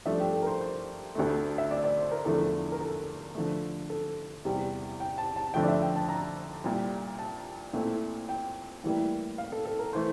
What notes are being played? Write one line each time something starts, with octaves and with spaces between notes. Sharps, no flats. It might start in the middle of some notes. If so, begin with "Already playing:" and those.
G2 F3 A3 D4 E5
G4
A4
A#4
C5
C5
D2 D3 A3
E5
D5
D5
C5
A#4
E2 D3 F3 A3 A4
A#4
A4
D3 F3 A3
A4
E2 C3 G3
G5
A5
A5
F2 D3 F3 A3 G5
D5
E5
G5
A5
A#5
C2 A#2 G3
A5
A#2 A3 C4 E4
G5
A2 E3 G3 A#3 E4
F5
A4
A4
A#4
E3 A3 C5